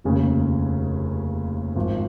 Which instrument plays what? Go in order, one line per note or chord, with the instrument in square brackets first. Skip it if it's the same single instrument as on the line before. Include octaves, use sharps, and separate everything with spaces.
[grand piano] F1 D#2 C#3
G#1 G#2 F3